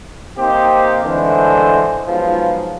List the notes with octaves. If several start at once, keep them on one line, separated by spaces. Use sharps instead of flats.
A#3 C4 D#4 G4 C5
D3 E3 G#3 A3 C5
G#2 F3 F#3 B3 F4